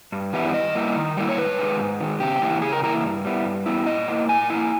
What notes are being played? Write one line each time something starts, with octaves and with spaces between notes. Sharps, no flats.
G2
E3 G3 B3 E4
D#3 D#5
G3 A#3 E4
D#3
G3 A#3 E4
C#5
G#2 B4
D#3 G#3
G#2
D#3 G#3
C#3 G4
E3 A#3 E4
C#3 G#4
A#4
E3 A#3 E4 A#4
G2
G3 B3 E4
G2
G3 B3 E4
A#2 D#5
A#3 E4
A#2 G#5
A#3 E4